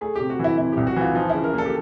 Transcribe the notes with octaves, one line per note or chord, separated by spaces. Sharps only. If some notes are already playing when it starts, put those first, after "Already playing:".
A3 G#4
C3 G4
F#4
E3
E4
C3 E4
C2 G4
F#4
E3 F4
F3 D#4
C#3 E4
A#4
A#3 A4
G4